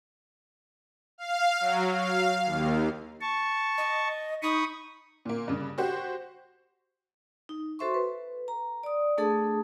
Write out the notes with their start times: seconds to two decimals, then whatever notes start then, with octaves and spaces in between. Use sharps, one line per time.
1.18 F5
1.60 F#3
1.94 F5
2.46 D#2
3.21 A5 C#6
3.78 D#5
4.42 D#4 B5 C#6 D#6
5.25 A#2 A#3
5.48 G2 C#3
5.78 F#4 G4 C5 F#5
7.49 D#4
7.79 F#4 A4 C5 E5 C6 C#6
7.94 A4 B4
8.48 A#5
8.83 D5 D#6
9.18 A3 D4 G#4 A4 A5 D#6